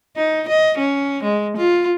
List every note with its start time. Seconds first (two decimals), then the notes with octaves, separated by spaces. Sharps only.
0.16 D#4
0.48 D#5
0.78 C#4
1.23 G#3
1.57 F4